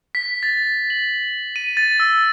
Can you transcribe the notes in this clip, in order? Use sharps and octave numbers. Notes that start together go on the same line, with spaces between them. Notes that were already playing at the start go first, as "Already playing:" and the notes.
B6
A6
F#7
D#7
A6
E6